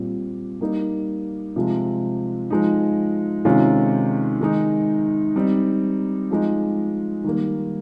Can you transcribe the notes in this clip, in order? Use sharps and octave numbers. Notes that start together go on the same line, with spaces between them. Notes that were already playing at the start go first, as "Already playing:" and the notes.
Already playing: A#2 G3 C4
G3 A#3 D#4
C3 F3 G#3
F3 G#3 D#4
C3 D#3 G#3 C#4 F4
D#3 G#3 D#4
G3 C4 D#4
F3 G#3 D#4
D#3 G3 A#3